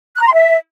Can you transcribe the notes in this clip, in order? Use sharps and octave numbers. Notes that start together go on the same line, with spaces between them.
F#6
A#5
C6
E5